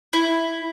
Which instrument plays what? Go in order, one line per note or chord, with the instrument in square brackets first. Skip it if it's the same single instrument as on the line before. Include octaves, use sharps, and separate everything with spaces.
[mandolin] E4